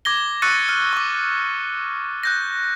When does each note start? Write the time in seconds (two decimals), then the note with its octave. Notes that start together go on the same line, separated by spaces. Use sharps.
0.05 D6 G#6 A#6 G7
0.42 C#6 E6 F#6 A6 C#7 D#7
0.69 F6
0.93 C#6 D6
2.23 F#6 G6 A#6